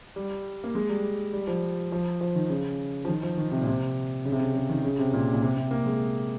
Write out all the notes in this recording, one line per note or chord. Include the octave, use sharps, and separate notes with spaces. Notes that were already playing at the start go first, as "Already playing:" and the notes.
G3
A#3
G#3
G3
G3
F3
F3
F3
D#3
C#3
F3
D#3
F3
D#3
C3
A#2
C3
C#3
C3
C#3
C#3
D#3
C#3
C3
A#2
A#2
C3
C3
A#3
G#3